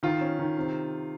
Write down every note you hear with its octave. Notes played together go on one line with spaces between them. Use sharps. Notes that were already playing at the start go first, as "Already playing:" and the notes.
D#3 F4
C#4
D#3
C3